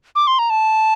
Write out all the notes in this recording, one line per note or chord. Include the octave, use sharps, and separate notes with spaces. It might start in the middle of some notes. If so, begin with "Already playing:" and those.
D6
C6
A#5
A5